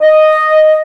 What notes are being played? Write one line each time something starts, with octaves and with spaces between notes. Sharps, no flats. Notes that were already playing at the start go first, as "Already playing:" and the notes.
D#5